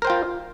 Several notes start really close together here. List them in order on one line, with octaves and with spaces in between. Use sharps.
A#4 C5 G5 F4